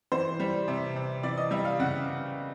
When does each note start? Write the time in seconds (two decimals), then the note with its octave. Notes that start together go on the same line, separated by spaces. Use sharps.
0.12 E3 C5
0.40 G3
0.68 C3
0.96 C3
1.23 E3 D5
1.37 D#5
1.51 G3 E5
1.65 F5
1.80 C#3 F#5